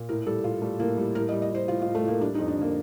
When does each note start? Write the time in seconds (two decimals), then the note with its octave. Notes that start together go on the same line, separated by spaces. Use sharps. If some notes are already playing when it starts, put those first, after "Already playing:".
Already playing: A#2
0.09 A2 A#4
0.26 G3 A4
0.44 A2 F4
0.62 G3 A3
0.80 A2 A#3
0.97 G3
1.15 A2 A#4
1.29 D#5
1.32 G3
1.42 D#5
1.51 A2 C5
1.68 A2 F4
1.82 F4
1.86 A2
1.95 A3
2.03 A2 A#3
2.21 G3 D4
2.34 D#4
2.39 F2
2.48 D4
2.57 D3 A#3